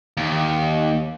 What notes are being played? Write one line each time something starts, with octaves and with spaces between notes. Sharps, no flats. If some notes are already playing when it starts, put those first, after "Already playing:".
D#2